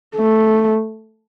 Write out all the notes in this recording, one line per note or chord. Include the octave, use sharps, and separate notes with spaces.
A3